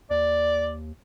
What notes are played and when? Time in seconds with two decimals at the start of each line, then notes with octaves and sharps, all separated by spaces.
0.11 D#2 D5